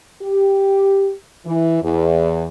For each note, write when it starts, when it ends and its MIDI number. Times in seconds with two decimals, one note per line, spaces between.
0.22 1.12 67
1.46 1.81 52
1.82 2.46 40